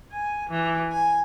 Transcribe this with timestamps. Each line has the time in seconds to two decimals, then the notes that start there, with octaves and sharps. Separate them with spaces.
0.10 G#5
0.49 E3
0.90 G#5